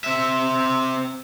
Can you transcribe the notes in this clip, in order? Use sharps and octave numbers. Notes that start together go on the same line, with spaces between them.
C4 E5